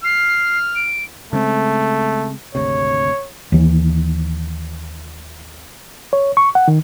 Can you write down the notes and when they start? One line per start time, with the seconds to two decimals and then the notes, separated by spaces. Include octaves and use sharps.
0.04 F6 C7
0.75 D7
1.33 C#3 G#3 A3 C4
2.55 G#1 D2 C3 C#5
3.52 D#2 E3
6.13 C#5
6.37 C#6
6.55 F#5
6.68 D#3